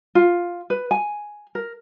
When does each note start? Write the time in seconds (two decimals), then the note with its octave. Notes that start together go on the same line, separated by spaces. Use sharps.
0.15 F4
0.70 B4
0.91 G#5
1.55 A#4